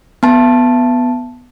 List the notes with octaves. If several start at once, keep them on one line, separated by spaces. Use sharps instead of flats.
B3 A5